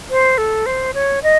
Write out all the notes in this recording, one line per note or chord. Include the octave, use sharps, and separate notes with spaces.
C5
A4
C5
C#5
D#5